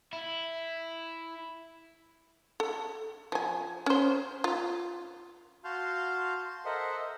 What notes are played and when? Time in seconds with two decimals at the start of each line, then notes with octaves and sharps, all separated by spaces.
0.13 E4
2.60 A4
3.32 F3 G#5
3.86 C#4 C5
4.44 F4
5.64 F#4 F5 A5 C6 F6 G6
6.45 C6
6.65 A4 A#4 C5 D#5 E5 F#5